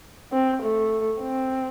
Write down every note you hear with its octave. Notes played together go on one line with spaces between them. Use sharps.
C4
A3
C4